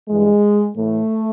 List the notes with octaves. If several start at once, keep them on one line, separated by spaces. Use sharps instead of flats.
G2 E3 G#3
A2 E3 A3